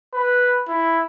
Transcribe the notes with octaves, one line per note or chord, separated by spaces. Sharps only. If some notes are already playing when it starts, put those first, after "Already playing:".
B4
E4